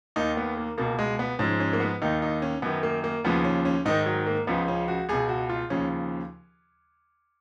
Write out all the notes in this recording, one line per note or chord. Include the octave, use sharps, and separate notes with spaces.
D#2 D#3 D#4
B3
A#3
C#2 B2 A#3
G#3
B3
G#2 F3 C#4
C#4
A#3
B3
D#2 D#3 D#4
D#4
C#4
F#2 D#3 B3
A#3
A#3
D#2 C#3 F3 B3
C#4
C#4
G#2 D#3 D#4
F#3
A#3
C#2 C#3 F3 B3
C#4
F#4
C#2 B2 G#4
F#4
F4
D#2 C#3 F3 C#4